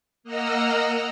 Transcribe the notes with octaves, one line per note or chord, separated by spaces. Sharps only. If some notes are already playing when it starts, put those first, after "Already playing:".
A#3 D#5 F#5 A#5 E6 F6